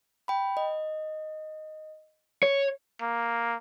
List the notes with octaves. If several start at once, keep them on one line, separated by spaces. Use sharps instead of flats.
G5 B5
D#5
C#5
A#3